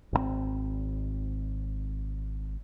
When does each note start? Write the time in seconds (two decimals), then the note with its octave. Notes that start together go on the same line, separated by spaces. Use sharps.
0.13 G#1 D3 C4